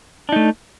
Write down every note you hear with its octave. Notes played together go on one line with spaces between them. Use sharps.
A3 D4 D#4